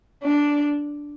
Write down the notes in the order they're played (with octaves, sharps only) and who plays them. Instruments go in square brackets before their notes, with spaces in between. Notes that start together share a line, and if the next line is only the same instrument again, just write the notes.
[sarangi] D4